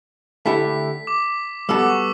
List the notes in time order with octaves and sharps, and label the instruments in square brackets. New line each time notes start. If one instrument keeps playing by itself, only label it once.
[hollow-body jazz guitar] D3 A3 E4 G4 [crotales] B6
[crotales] D6
[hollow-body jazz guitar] G3 B3 F#4 A4 [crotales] E6
[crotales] D6
C#6